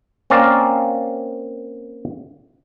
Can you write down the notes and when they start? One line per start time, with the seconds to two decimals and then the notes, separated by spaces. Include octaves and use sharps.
0.30 A#3 C4 C#4 A#4 D5 F5